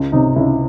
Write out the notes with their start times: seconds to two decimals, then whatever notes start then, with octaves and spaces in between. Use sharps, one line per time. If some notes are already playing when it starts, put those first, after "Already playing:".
Already playing: C#2
0.12 C3 D#4
0.36 C#2 E4